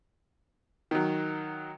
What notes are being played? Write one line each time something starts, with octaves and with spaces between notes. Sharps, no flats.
D#3 F#3